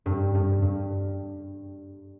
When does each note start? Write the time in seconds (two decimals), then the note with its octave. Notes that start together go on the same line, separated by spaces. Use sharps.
0.06 G2
0.35 G2
0.62 G2